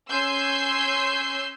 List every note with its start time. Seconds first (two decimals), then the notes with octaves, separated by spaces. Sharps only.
0.11 C#4 G#5 C6 E6 G6 C7